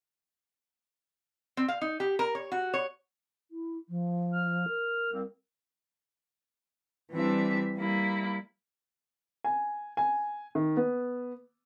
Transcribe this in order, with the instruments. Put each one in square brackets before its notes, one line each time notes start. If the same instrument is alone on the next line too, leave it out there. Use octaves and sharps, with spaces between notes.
[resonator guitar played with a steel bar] C4
F5
D#4
G4
A#4
C#5
F#4
C#5
[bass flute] E4
F3
[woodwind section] F6
[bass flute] A#4
[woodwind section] C2 A#3 C4
[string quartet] E3 G3 C4 D4 E5
G3 A#3 E4
[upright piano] G#5
G#5
D#3
B3